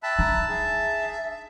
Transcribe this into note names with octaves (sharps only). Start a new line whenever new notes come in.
E5 G5 A5 B5 F#6
D4 D#4 A#5
G#4 E5